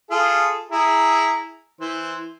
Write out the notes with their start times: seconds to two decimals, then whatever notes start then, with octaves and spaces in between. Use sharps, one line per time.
0.11 F4 G#4 A4
0.71 E4 G#4 A#5
1.81 E3 C5